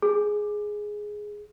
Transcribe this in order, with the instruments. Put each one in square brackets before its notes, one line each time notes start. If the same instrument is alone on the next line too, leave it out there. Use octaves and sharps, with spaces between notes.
[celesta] G#4